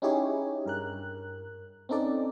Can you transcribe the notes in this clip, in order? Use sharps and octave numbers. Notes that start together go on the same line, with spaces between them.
C#4 D#4 E4 G4 G#4 C#5
G2 A#4 F#6
C4 C#4 D#4 A4 D5